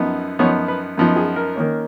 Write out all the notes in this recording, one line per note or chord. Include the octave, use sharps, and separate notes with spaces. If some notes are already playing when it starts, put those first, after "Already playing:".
Already playing: F#2 F3 B3 D#4
F#2 F3 B3 D#4 C#5
B4
F#2 F3 B3 D#4
G#4
A#4
D#3 A#3 C#4